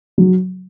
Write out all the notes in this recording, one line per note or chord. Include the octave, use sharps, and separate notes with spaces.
F#3